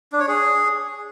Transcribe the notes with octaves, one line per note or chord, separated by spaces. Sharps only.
D4
C#5
G#4